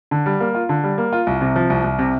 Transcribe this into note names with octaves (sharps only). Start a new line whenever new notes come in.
D3
G3
A#3
F4
D3
G3
A#3
F4
C2
C3
F3
C2
C2
C3